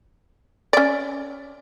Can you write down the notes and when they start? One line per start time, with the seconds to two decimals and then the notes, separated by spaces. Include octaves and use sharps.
0.73 C#4 D5